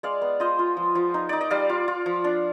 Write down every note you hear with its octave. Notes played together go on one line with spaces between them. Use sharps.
G#3 D5 F5
B3
F4 C5 D#5
F4
F3
F3
D#4
D#4 D5
D#5
G3 D5 F5
F4
F4
F3
D4